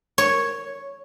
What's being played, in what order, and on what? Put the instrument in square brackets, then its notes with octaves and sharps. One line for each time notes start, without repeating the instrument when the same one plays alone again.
[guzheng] C#5